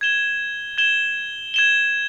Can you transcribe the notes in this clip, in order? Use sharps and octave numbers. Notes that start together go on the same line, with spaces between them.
G#6 E7 G7
G#6 E7 G7
G#6 E7 G7